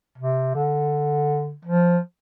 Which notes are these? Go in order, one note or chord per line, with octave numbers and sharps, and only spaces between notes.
C3
D3
F3